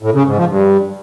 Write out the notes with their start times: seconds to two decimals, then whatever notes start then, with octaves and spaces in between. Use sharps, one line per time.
0.03 A2
0.14 C#3
0.26 G#2
0.38 F3
0.50 G2